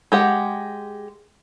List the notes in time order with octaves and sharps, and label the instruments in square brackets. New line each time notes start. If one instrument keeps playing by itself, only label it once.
[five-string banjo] G#3 G4 F#5